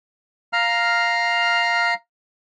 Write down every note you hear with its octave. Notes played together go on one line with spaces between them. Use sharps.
F5 A#5 F6